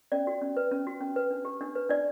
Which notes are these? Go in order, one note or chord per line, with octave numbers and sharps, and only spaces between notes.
C#4 D5
F#4
C#4
B4
C#4
F#4
C#4
B4
D4
G4
D4
B4
D4 D5